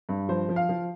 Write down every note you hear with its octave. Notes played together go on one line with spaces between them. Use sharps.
G2
F3 C5
F3
F5
F3